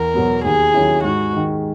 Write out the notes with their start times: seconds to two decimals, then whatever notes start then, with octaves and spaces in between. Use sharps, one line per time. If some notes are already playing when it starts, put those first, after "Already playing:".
Already playing: E2 A#4
0.14 B2 F#3 B3
0.44 D#2 G#4
0.74 D#3 F#3 C#4 E4
1.04 G#2 F#4
1.33 D#3 G#3